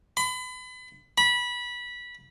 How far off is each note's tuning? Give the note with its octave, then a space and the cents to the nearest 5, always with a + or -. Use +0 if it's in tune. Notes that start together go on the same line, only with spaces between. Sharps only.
B5 +35
B5 -20